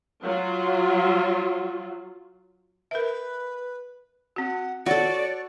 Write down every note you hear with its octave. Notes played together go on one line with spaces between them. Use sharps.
F#3 F4
A#4 B4 E5
C4 F#4 F#5
F#4 A4 C#5 D5 F#5